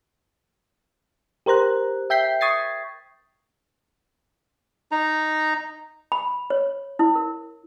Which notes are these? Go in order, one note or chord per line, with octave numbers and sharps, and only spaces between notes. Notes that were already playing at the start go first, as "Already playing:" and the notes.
G4 A#4 C5 A#5 F#6
E5 G5 G6 B6 C7
C#6 D#6 G#6 A6 C7
D#4 A#5
B5
C#5
E4
A#4